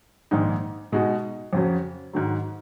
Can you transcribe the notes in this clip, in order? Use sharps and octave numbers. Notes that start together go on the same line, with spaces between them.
A#1 G#2 D#3 G#3 D#4
B2 G#3 D#4 F#4
F2 C#3 F#3 C#4
G#2 D#3 F#3